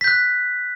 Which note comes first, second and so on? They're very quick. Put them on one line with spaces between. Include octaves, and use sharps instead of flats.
B6 G6 F#6